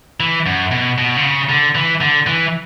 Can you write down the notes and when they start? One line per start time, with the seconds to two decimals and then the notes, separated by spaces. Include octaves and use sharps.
0.20 E3
0.46 F#2
0.71 B2
0.98 B2
1.17 D3
1.23 C#3
1.49 D3
1.75 E3
2.01 D3
2.27 E3